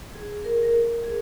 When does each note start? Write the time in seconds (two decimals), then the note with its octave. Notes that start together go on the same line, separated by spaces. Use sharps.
0.15 G#4
0.44 A#4
0.63 A#4
1.04 G#4